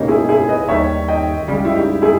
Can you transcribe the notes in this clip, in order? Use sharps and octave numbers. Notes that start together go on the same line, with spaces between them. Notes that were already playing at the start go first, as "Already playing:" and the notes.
Already playing: C#2 B2 A#3 C#4 D#4 G4
E4 G#4
E4 G#4
B4 D#5
D#2 D#3 G3 C#5 E5
D#5 G5
C#2 C#3 G3
E4
D#4 G4
E4 G#4